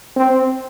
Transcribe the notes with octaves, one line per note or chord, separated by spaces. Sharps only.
C4